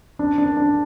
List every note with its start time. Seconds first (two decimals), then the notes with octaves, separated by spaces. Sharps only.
0.19 D4
0.38 D4
0.57 D4